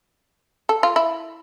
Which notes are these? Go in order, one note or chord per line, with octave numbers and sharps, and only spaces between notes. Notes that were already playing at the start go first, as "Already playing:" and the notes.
A4
F4
E4